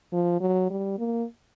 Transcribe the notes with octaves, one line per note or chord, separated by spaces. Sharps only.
F3
F#3
G3
A#3